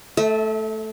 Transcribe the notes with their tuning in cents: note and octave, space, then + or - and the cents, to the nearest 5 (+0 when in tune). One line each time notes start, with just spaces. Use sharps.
A3 -5 E5 -35